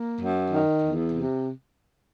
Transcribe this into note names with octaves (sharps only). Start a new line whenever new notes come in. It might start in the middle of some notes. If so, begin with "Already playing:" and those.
Already playing: A#3
F#2
D#3
E2
C3